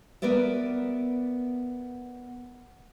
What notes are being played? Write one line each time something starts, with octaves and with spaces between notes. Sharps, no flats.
B3 A#4 B4 D5 E5